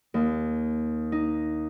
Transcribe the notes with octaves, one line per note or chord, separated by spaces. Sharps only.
D#2
D#4